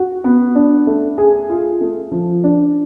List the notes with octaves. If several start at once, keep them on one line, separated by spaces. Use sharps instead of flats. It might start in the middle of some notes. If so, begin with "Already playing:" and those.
Already playing: F#4
B3
D4
A3
G#4
F4
A3
F3
D4